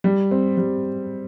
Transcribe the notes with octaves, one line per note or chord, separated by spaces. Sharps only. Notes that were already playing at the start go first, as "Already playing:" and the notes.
G3
C4
G3